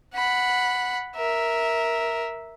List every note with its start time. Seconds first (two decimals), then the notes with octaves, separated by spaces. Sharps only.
0.14 F#5 B5
1.16 A#4 E5